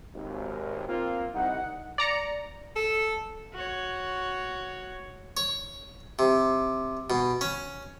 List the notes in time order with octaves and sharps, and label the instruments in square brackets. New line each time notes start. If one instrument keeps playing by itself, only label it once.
[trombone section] G#1 D#2
A#3 C4 F4
[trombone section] C2 D#4 [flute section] F#5
[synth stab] D5 A#5 C#7
[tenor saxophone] A4
[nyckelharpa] F#4 C#5
[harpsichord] C#5
C3
B2
C#4